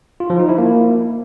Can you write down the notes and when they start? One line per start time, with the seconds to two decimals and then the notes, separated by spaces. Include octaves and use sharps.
0.20 F4
0.30 F3
0.39 D#4
0.49 E4
0.59 A#3